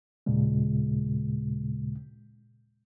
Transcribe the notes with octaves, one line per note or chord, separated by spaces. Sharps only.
D#2 A#2 C#3 G#3